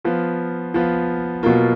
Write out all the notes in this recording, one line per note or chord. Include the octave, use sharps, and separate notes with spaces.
F3 B3 F4
F3 B3 F4
B2 F#3 A#3 F4